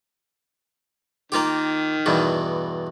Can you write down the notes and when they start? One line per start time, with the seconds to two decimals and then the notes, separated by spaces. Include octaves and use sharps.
1.32 D#3 A#3 F4 G4
2.06 E2 G2 B2